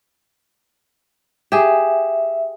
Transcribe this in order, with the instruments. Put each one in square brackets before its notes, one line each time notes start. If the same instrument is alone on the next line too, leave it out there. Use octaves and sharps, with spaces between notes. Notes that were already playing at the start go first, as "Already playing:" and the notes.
[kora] G4 G#4 [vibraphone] E5